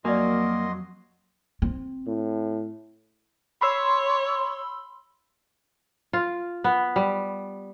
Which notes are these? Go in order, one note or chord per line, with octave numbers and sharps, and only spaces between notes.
F2 F#3 A#3 F#4 D5 D#5 G#5 C6
C4
A2
C#5 B5 C6 E6
F4
B3
G3